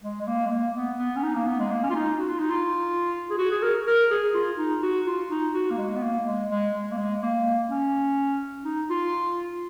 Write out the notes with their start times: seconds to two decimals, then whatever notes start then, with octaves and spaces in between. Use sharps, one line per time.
0.04 G#3
0.21 G#3
0.27 A#3
0.45 G#3
0.51 A#3
0.75 B3
0.99 B3
1.16 C#4
1.23 D#4
1.35 A#3
1.47 B3
1.59 G#3
1.71 A#3
1.83 C#4
1.90 F4
1.95 D#4
2.19 F#4
2.29 F4
2.39 D#4
2.50 F4
3.30 G#4
3.38 F#4
3.51 G#4
3.62 A#4
3.87 A#4
4.10 G#4
4.34 F4
4.58 D#4
4.82 F#4
5.06 F4
5.31 D#4
5.54 F#4
5.71 A#3
5.77 G#3
5.96 B3
6.02 A#3
6.26 G#3
6.50 G#3
6.74 G#3
6.92 A#3
6.97 G#3
7.22 A#3
7.70 C#4
8.65 D#4
8.90 F4